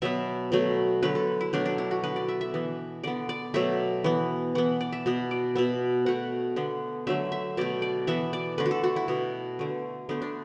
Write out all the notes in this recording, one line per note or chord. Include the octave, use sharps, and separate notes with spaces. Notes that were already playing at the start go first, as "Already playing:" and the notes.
B2 F#3 B3 E5
B2 F#3 A3
D3 F#3 A3 B4
A4
E4
B2 F#3 A3 D4
D4
E4
F#4
D3 B3 B4
D5
E5
E5
E3 B3
D3 B3 D5
D5
B2 F#3 A3 E5
E3 B3
E3 B3 F#5
D5
E5
B2 B3
D5
B2 B3 E5
B2 A3 F#5
D3 B3
D3 F#3 A3 E5
E5
B2 A3 D5
D5
E3 B3 E5
D5
D3 A3 B4
F#4
A4
F#4
E4
B2 B3
D3 A3
D3 A3 B3
D4